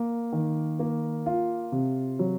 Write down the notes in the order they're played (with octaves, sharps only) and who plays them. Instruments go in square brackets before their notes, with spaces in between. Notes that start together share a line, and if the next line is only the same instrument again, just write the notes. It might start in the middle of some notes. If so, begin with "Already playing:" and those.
Already playing: [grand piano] A#3
D#3
A#3
F4
C3
F#3